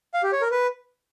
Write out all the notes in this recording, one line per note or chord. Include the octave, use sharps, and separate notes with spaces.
F5
G4
C#5
A#4
B4